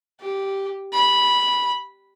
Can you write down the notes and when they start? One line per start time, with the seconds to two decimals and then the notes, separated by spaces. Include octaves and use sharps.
0.21 G4
0.93 B5